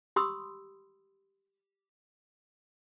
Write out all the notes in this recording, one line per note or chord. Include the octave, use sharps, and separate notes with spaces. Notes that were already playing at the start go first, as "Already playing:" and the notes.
G4 B5 C6 D#6 E6